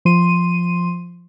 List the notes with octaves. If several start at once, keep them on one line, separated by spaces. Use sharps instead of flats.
F3 C6 D#7